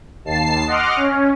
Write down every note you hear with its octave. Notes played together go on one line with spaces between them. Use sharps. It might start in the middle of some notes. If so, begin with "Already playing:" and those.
D#2 A5 C7
D#5 F#5 C6 D6 F6
C#4